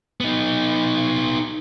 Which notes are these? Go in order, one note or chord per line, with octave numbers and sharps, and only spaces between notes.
B3 D#4